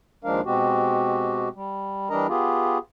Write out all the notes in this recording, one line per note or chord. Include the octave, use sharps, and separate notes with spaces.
D#2 F3 G#3 D4 A#4 F5
B2 G#3 C4 F#4 G4
G3
E3 G3 D4 A#4 D#5 A#5
B3 F4 G4 G#4